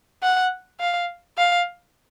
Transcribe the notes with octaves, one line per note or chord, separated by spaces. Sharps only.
F#5
F5
F5